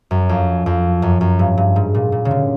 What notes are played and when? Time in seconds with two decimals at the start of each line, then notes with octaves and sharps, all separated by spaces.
0.11 F#2
0.29 F2
0.66 F2
1.02 F#2
1.21 F#2
1.39 G2
1.57 G2
1.76 G#2
1.94 A#2
2.12 A#2
2.25 C#3
2.31 D3